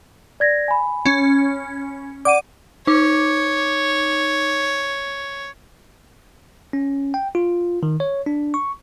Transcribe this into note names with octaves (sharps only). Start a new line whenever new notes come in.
D5 G#6 A#6
G#5 B5
C#4
D5 F#5 D6 D#7
D#4 C#5 D6
C#4
G5
F4
D#3
C#5
D4
C#6